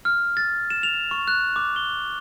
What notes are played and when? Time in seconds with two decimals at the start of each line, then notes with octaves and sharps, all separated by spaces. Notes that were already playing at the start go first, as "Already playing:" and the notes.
0.05 F6
0.37 A6
0.70 E7
0.83 F7
1.11 C#6
1.28 F#6
1.56 D6
1.76 G7